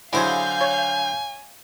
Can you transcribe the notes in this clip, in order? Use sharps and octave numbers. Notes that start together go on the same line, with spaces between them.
D3 F#3 E4 G#4 C5 F5 G#5 G6
C#5